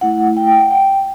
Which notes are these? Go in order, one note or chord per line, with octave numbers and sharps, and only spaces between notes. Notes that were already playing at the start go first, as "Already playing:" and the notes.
A3 E4 F#5
G5
G5
F#5
G5